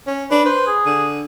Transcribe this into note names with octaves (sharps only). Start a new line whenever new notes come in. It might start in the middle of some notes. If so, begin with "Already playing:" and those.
C#4
D4 B4
B4 C5
G#4
D3